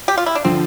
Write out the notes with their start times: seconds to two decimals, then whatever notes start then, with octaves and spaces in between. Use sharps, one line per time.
0.08 G4
0.18 F4
0.26 E4
0.35 D4
0.45 D3 F3 C4